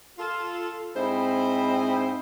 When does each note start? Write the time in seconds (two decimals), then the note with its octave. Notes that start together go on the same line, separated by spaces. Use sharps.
0.18 F4 A4
0.95 G#2 C4 E4 C5 D#5 B5